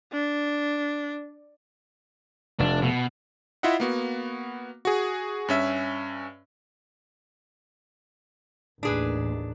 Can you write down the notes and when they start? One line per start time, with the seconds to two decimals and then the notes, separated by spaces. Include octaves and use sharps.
0.13 D4
2.60 F1 D4
2.82 B2
3.63 E4 F4 D#5 E5 F#5
3.80 A#3 B3 F#4
4.85 F#4 G#4
5.49 G2 C#4 E5
8.83 A1 D#2 D4 G#4 B4